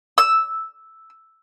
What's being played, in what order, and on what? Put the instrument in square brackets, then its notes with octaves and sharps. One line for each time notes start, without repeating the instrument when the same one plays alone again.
[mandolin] E6